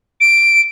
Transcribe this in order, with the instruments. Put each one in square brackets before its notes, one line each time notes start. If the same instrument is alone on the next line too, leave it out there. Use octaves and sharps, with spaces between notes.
[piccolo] D7